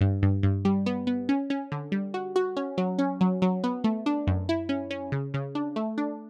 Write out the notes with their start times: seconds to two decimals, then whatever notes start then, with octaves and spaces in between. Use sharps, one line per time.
0.01 G2
0.22 G2
0.43 G2
0.65 G3
0.86 B3
1.07 B3
1.29 C#4
1.50 C#4
1.72 D3
1.92 G3
2.14 F#4
2.36 F#4
2.57 C#4
2.78 F#3
2.99 C#4
3.21 F#3
3.42 F#3
3.64 B3
3.84 A3
4.06 D4
4.27 F#2
4.49 E4
4.69 C#4
4.91 C#4
5.12 C#3
5.34 C#3
5.55 D4
5.76 A3
5.98 D4